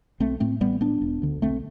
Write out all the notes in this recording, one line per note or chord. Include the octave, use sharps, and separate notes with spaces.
B1 A3 C4
A2 A3 C4
A1 G3 B3
A2 B3 D4
E1
D2 D3
B1 A3 C4